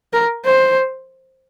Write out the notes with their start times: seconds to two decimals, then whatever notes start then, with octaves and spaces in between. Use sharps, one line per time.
0.13 A#4
0.46 C5